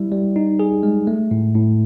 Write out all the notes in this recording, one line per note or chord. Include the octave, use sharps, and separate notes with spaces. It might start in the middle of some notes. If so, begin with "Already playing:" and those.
Already playing: G3 E4
G3
D#4
G#4
G#3
A3
A2
A2